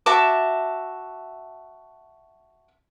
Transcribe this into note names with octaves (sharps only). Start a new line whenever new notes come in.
F#4 E5 A5 D6